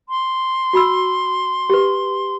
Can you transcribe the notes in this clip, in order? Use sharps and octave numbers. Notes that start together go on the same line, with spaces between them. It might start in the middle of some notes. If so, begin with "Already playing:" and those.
C6
F#4 B5 E6
G4 B4